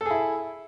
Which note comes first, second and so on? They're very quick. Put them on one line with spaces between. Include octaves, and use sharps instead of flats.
A4 G#4 E4